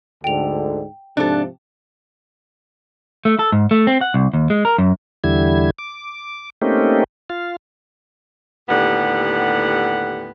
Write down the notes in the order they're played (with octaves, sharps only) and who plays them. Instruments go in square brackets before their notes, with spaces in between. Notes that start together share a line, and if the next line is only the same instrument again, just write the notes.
[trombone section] D2 G#2 D3 [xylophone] G5 F7
[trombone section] G#2 C3 F3 [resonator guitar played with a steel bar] D4 A4
[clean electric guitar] A3
A4
G#2
A3
C4
F#5
C2
D#2
G#3
A#4
F#2
[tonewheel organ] E2 D3 G3 E4 G#6
D6
A3 A#3 C4 C#4 D#4 G4
F4 F5
[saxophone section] D#2 A2 D3 B3 G4 F#5